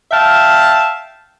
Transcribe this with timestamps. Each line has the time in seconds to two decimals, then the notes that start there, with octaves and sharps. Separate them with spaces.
0.11 E5 F5 G5 A5